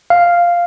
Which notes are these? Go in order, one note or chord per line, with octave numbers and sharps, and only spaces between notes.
F5